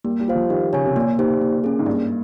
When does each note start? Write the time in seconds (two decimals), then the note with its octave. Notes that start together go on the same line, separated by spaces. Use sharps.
0.04 G3 A#3
0.20 G3
0.28 F4 C5 F5
0.35 F3
0.50 D#3 G4
0.73 C#3 C#5 G#5
0.85 C3
0.95 A#2 A#3
1.19 D#4 G4 C5
1.41 A#3
1.64 C#4 G#4
1.79 G#2
1.86 G2 A#3